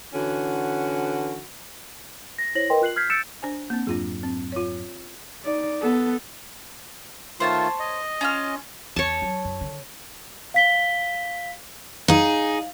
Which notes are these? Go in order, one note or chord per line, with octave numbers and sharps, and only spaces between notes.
D3 E3 C#4 F#4
A#6
E4 C5 C#5 A#6 F#7
A#4 B4 D#5 G5 C6
F4 F#6 C7 F#7
F6 G6 G#6 B6 C7
E6 G6 A6 C#7 D7 E7
D4 C5 G#5
A#3 C4
F2 G#2 F#3 D4 F4 G#4
C4
F4 C#5
D#4 D5
B3 A4
D#3 A3 F4 C5 C#5 A5
D#5
C#4 F4 F6
E2 C#5 A5
F#3
F#2
D3
F5 B6 G7
D#4 G#4 F5